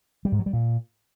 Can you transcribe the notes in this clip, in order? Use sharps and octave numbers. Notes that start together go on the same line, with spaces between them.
G3
G#2
F#3
G3
A#2